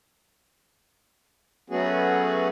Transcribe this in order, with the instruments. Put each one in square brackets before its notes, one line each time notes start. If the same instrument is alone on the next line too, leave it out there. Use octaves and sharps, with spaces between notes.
[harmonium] F#3 A3 B3 C#4 F#4 G#4